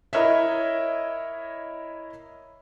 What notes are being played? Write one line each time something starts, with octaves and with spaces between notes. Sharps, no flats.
E4 A#4 C#5 D#5 E5